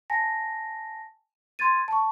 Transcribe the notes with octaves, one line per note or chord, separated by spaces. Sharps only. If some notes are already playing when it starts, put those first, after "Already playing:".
G#5 A5 A#6
C6 G#6 A6 D#7
A5 C#6